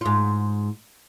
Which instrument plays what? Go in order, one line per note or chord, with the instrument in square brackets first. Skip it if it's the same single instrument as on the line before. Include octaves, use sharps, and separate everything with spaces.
[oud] G#2 F4